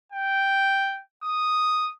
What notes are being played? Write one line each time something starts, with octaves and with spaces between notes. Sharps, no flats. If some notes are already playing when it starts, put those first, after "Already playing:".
G5
D#6